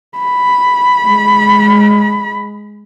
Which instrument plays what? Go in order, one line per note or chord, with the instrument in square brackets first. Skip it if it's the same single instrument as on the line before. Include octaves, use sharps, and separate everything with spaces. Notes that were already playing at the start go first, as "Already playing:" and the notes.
[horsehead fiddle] B5
[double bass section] G#3